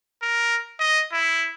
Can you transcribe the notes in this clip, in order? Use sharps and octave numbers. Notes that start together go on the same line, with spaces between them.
A#4
D#5
E4